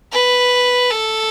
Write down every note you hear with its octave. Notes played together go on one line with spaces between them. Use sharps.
B4
A4